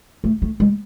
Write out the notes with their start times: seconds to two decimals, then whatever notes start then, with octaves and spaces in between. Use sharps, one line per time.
0.24 A3
0.42 A3
0.60 G#3